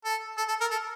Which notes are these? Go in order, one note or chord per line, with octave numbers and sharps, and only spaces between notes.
A4
A4
A4
A#4
A4